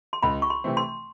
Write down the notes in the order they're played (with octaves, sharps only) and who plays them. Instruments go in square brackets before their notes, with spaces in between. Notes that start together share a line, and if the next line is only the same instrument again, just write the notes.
[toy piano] C6
[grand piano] C#2 [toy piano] B5
[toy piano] C#6
C6
[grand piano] C3 E3 A3 C4
[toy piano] C6